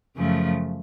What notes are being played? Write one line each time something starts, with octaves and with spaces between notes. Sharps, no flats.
F#2 C#3 F3 A3